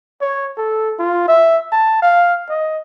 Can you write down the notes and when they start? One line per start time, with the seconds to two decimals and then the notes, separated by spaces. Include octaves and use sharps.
0.21 C#5
0.57 A4
0.99 F4
1.28 E5
1.72 A5
2.02 F5
2.49 D#5